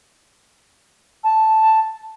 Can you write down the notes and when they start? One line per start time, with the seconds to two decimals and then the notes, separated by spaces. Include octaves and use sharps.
1.24 A5